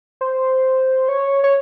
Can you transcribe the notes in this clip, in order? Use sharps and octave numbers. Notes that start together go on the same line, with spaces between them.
C5
C#5
C#5